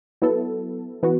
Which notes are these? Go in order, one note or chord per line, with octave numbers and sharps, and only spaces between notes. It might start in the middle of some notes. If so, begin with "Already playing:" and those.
F#3 B3 E4 A4
E3 B3 F#4